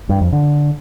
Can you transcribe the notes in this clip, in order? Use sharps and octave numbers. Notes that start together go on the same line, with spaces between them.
G2
F2
D3